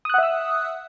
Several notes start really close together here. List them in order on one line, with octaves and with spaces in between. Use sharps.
D#6 F#6 F#5 E5 E6